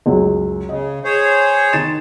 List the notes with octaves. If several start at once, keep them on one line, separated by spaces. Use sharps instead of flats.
C#2 F#2
C#3 D#5
G#4 C5 C#5
D#3 A6 E7